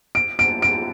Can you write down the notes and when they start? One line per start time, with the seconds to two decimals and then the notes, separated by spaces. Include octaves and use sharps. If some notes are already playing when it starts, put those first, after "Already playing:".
0.15 D7
0.39 D7
0.62 D7